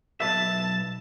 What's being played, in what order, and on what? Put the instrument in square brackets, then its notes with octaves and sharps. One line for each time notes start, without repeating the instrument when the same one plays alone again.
[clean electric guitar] B1 B4 E5 [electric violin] A5